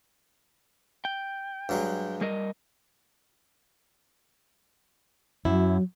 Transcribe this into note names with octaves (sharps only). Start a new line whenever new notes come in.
G5
G2 F#3 G#3
G3 A#4 D#5
F#2 F#3 E4